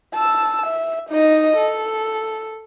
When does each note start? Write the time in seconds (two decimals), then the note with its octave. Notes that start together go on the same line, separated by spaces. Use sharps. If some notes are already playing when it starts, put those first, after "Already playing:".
0.14 A5 E6
0.66 E5
1.10 D#4 D#5
1.57 A4